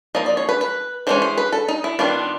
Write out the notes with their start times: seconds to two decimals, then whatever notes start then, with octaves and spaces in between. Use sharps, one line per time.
0.15 F3 A#3 D#4 D#5
0.26 D5
0.37 C#5
0.49 B4
0.61 B4
1.07 E3 G#3 C#4 C5
1.22 C5
1.38 B4
1.53 A4
1.68 D#4
1.84 E4
1.99 D#3 G3 B3 D4 F4